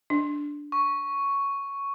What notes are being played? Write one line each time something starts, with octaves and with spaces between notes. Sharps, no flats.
D4
C#6